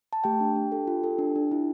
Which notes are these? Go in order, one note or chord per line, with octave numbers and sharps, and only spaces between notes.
A5
A3 G4 G5
D4
D4
A4
F4
A4
D4
D4
E4